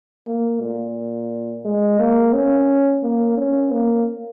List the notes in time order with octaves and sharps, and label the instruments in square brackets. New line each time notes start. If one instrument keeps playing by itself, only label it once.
[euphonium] A#3
A#2
G#3
A#3
C#4
A#3
C#4
A#3